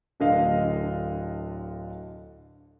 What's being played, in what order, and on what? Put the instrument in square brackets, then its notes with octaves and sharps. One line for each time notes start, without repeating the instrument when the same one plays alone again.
[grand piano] D1 D3 D#5 F5